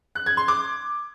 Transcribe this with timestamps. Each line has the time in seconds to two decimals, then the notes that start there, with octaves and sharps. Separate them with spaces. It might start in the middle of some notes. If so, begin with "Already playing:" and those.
0.15 F#6
0.26 G#6
0.37 C6
0.48 D6